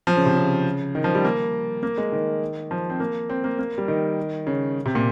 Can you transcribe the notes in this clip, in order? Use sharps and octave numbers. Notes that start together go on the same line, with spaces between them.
F3
C#3
C3
C#3
D#3
F3
G3
A#3
A#3
G#3
D#3
F3
C4
A#3
C4
A#3
A#3
G3
D#3
C#3
C3
A#2